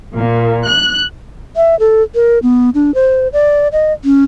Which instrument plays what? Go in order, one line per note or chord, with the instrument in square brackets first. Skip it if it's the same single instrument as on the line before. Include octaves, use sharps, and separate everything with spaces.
[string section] A#2
F#6
[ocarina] E5
A4
A#4
B3
D4
C5
D5
D#5
C#4